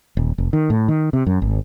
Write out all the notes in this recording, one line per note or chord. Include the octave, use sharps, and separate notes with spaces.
D#1
F1
D#3
A2
D#3
C3
F#2
G#1